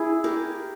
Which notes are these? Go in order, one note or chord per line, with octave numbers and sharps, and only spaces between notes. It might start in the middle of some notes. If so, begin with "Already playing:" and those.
Already playing: E4 G#4
G4 A#4